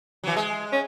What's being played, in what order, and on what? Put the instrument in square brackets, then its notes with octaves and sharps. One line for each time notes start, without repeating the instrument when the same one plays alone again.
[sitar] E3 F#3
G#3
[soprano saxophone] C#4